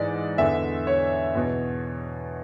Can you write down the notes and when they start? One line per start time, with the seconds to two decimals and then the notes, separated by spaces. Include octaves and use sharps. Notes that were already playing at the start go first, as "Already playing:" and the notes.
Already playing: G#2 E3 D5
0.38 E2 D3 E5
0.87 C#5
1.35 E2 B2